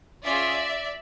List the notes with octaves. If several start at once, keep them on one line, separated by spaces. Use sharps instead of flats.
C#4 F4 G#4 D5 E5